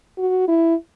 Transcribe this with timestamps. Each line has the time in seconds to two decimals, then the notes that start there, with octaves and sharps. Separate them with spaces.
0.18 F#4
0.48 E4